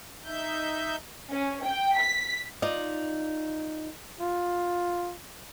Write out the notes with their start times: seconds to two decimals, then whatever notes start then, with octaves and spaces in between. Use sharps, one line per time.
0.24 D#4 E5 G6
1.31 C#4
1.65 G5
1.98 B6
2.62 D#4 F4 D5 D#5
4.21 F4